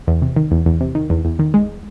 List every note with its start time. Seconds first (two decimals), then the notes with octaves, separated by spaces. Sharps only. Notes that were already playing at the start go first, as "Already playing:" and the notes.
0.07 E2
0.22 C3
0.36 D#3
0.51 E2
0.66 E2
0.81 C3
0.95 D#3
1.10 E2
1.25 E2
1.39 D#3
1.54 G#3